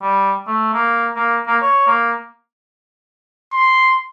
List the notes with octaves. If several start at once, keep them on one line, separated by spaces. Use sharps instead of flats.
G3
A3
A#3
A#3
A#3
C#5
A#3
C6